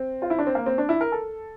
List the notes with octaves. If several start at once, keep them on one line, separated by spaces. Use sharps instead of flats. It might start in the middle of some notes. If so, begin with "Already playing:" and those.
Already playing: C4
F4
E4
D4
C4
A#3
C4
D4
E4
A#4
A4